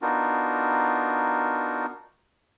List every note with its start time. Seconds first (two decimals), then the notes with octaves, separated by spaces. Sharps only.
0.02 B3 D4 D#4 F4 F#4 A#4